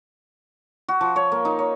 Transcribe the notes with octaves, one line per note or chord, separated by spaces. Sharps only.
F#4
F3
C#5
A#3
D#4
C#5